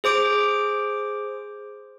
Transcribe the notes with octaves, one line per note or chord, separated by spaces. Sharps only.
G#4 C5 D6 D7